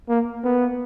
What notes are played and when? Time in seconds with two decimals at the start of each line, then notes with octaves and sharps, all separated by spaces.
0.09 A#3
0.44 B3